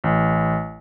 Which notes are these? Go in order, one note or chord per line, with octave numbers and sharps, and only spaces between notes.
A1